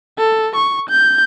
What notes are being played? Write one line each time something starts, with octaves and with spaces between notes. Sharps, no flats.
A4
C#6
G6